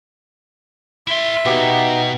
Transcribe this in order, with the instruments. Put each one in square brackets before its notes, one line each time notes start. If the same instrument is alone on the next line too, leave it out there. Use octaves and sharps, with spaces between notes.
[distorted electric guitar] E4 C6 [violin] E5
[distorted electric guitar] B2 [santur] B3 G4 [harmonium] D#4 F#4